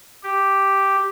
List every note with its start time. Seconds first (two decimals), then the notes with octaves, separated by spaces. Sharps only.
0.23 G4